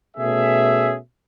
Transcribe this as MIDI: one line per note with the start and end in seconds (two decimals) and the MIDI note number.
0.17 0.97 47
0.17 0.97 57
0.17 0.97 61
0.17 0.97 68
0.17 0.97 76